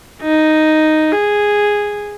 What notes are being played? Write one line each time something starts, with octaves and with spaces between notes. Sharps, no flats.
D#4
G#4